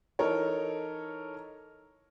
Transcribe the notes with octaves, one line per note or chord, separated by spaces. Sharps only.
E3 D#4 A4 A#4 C#5